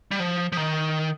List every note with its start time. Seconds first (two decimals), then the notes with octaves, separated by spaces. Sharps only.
0.11 G3
0.20 F3
0.52 F3
0.57 D#3